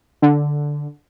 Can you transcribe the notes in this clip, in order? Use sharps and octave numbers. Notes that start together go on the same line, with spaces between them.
D3